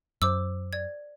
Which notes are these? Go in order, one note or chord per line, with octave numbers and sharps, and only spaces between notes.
F#2 C5 D6 E6
D5 G#6